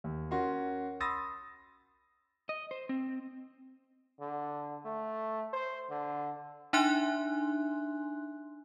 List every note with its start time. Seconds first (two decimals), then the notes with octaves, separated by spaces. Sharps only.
0.04 D#2
0.31 C#4 F#4 A#4 C6
1.00 B5 C6 D#6 E6 A6 A#6
2.49 D#5
2.71 C5
2.89 C4
4.20 D3
4.85 A3
5.53 C5
5.90 D3
6.73 D4 D#4 E5 G#5 C6 F#6